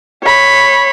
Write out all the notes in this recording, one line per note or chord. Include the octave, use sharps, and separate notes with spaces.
C#5 B5